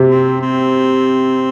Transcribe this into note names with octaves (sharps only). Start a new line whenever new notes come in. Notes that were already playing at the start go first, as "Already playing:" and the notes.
Already playing: C3
C4
C4